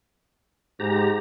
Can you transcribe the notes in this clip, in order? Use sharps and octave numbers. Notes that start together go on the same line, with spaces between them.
G#2 G4 A#5